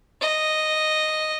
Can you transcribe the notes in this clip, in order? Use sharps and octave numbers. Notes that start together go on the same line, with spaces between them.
D#5